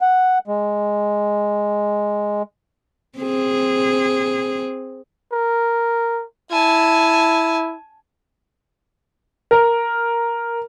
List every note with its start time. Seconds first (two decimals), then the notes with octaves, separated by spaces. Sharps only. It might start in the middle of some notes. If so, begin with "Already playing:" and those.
0.01 F#5
0.48 G#3
3.19 C4 G#4
5.32 A#4
6.52 E4 G#5 A5
9.51 A#4